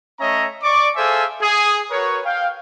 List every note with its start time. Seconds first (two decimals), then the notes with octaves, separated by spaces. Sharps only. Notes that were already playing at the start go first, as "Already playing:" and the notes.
0.20 A3 C#4 C#5 D#5 E5 A#5
0.63 D5 C#6 D6
0.96 G#4 A4 C5 E5 F5 G#5
1.42 G#4
1.91 F#4 A#4 B4 C#5
2.26 F5 G5